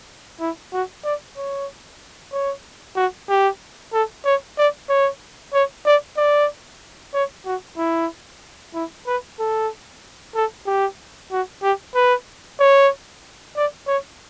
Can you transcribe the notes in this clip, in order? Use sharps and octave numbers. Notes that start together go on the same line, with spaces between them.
E4
F#4
D5
C#5
C#5
F#4
G4
A4
C#5
D5
C#5
C#5
D5
D5
C#5
F#4
E4
E4
B4
A4
A4
G4
F#4
G4
B4
C#5
D5
C#5